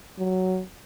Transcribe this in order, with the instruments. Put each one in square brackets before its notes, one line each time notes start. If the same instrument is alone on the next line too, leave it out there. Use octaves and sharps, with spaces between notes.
[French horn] F#3